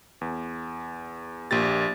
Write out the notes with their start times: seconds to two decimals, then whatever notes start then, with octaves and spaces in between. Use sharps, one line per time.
0.21 E2
1.51 A#1 A#2 G4 A6